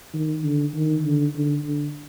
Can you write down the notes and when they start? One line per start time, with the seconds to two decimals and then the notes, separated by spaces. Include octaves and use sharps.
0.14 D#3
0.44 D3
0.75 D#3
1.05 D3
1.36 D3
1.65 D3